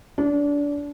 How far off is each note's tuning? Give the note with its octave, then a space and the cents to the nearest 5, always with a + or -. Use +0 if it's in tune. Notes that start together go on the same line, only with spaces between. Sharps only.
D4 -25